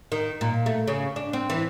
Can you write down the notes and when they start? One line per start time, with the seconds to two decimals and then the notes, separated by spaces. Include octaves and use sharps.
0.12 D#3
0.41 A#2
0.66 A3
0.88 C#3
1.16 D4
1.33 C4
1.50 E3